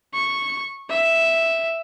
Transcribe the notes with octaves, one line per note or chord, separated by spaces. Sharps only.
C#6
E5